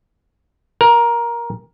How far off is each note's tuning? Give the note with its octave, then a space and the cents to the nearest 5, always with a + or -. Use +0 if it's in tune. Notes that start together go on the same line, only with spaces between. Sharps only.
A#4 +15